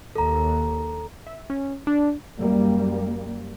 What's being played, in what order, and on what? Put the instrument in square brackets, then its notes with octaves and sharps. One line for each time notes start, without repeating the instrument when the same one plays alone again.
[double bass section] D#2 [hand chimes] A4 A#5
[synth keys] E5
C#4
D4
[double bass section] F#2 G3 A#3